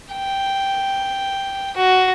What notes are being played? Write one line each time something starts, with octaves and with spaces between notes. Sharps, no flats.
G5
F#4